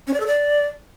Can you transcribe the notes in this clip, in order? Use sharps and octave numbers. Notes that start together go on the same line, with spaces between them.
C#4
D5
A4
D5